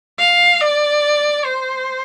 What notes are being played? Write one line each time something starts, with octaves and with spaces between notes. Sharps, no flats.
F5
D5
C5